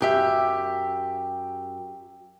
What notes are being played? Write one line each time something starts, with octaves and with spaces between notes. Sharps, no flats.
F#2 G4 E5